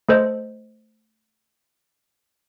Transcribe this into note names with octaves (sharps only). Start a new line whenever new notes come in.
A3 A4 C5 D#5